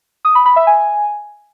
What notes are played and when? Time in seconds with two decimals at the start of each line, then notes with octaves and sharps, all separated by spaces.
0.25 D#6
0.35 B5
0.46 B5
0.56 E5
0.67 G#5